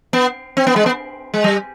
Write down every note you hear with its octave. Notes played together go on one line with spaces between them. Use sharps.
B3
C4
B3
G#3
B3
G#3
G3